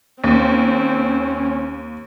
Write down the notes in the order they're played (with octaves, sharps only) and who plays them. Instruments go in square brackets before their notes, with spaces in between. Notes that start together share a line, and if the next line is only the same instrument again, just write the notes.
[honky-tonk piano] D#2 [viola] C4 [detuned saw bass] C#4